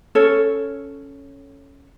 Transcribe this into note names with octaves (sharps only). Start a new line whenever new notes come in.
C#4 A4 C#5